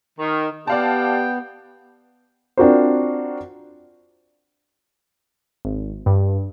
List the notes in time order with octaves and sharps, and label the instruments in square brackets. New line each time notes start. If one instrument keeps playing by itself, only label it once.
[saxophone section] D#3
[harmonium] B3 [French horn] G4 [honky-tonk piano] D5 F5 A5 [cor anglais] G5
[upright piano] C4 D4 F4 F#4 A#4 C5
[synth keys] G#1
G2